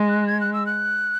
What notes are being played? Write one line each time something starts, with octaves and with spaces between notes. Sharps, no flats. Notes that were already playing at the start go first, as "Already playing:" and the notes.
Already playing: G#3
F#6
G#6
F#6
E6
F#6